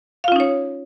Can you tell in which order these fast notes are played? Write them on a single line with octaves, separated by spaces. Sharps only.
F5 F4 C#4 D#4 C#5